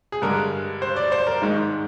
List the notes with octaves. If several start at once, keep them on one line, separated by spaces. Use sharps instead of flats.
G#4
G2 D3 G#3 A#4
C5
D5
C5
A#4
G#2 D#3 G#3